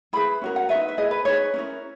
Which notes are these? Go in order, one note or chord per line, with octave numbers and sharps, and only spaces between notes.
E4 G#4 B4 B5
C#4 F#4 A#4
F#5
F#4 B4 E5
D#4
E5
E4 G#4 B4 D#5
B4
D#4 G#4 B4 C#5
C#4 E4 A#4